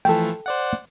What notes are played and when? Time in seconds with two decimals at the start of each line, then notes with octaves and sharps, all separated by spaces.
0.05 E3 F3 A3 A4 G5
0.46 C5 D5 F#5